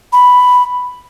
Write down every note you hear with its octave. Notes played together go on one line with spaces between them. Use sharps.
B5